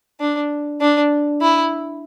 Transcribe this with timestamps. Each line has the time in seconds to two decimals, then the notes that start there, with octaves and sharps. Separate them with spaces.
0.20 D4
0.81 D4
1.42 E4